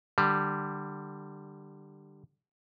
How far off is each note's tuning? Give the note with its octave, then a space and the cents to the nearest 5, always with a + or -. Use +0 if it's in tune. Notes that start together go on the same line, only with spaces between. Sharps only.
D3 +25 G3 +0